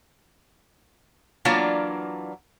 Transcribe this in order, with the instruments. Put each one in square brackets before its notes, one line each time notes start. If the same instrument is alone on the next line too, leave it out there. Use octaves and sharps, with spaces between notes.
[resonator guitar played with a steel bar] E3 F#3 A#3 D4 F4 D5